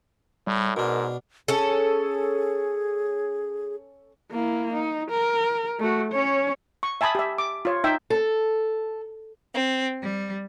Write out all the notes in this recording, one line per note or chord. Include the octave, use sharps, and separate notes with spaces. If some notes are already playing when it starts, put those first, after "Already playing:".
A2 G3
G#2 B2 D4 A#4
C#4 G#4 A4
A#3 E4
D#4
A#4
A3 F#4
C#4 C#5
C#6
E5 G#5 A5 B5 D#6
G4 E5
D6
F4 C#5
D#4 E5 G5
A4
C4
G3